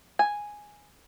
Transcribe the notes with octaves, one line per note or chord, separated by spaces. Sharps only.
G#5